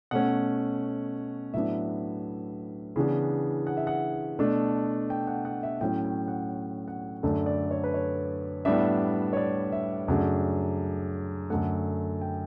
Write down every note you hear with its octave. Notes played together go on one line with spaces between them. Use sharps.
B2 A3 C#4 F#5
A2 F#3 B3 D4 E5
C#3 E3 B3 D4
F#5
E5
F#5
B2 A3 D4
G5
F#5
F#5
E5
A2 F#3 C#4 G5
G5
F#5
F#5
F#2 D3 A3 D4
D5
C#5
B4
C#5
A2 G3 B3 D4 E5
C#5
D5
E5
F#2 C#3 F#3 A3 D4 F#5
F#2 D3 A3 F#5
G5